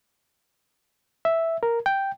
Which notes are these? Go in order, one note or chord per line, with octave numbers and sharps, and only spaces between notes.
E5
A#4
G5